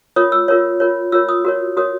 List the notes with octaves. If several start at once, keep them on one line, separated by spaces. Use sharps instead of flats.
F4 A#4 C#5 D#6
E6
F4 A#4 C#5
F4 A#4 C#5
F4 A#4 C#5 E6
D#6
F#4 A#4 C#5
F#4 A#4 C#5 D#6